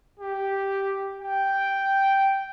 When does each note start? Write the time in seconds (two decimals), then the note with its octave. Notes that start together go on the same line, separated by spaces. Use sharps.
0.19 G4
1.22 G5